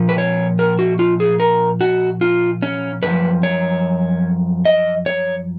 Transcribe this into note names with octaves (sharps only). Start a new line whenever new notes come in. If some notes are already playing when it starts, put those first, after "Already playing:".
Already playing: A#2 F3
B4
C#5
A#4
F#4
F4
G#4
A#4
F#4
F4
C#4
F#2 F3 B4
C#5
D#5
C#5